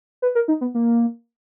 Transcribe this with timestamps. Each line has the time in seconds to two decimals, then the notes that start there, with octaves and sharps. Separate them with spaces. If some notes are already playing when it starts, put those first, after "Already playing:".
0.22 B4
0.35 A#4
0.48 D#4
0.61 B3
0.74 A#3